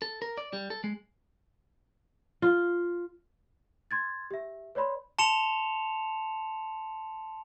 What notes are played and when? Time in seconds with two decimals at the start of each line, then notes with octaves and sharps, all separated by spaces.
0.02 A4
0.22 A#4
0.38 D5
0.53 G3
0.70 A4
0.84 G#3
2.42 F4
3.91 C6 G#6 A6
4.31 G4 E5
4.75 B4 C#5 D5 B5 C6
5.19 A5 C6 C#7 E7 F7